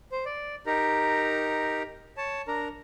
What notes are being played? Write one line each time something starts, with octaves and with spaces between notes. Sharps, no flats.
C5
D5
D#4 G4 A#4 A#5
C#5 A5
D4 A#4 A#5